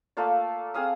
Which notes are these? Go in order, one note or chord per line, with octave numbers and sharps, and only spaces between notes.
A3 A#3 F4 D5
C4 G#4 F5 D#6